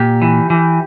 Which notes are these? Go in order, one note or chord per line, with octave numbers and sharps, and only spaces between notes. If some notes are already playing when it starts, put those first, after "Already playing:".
Already playing: A#2 G4
E3
E3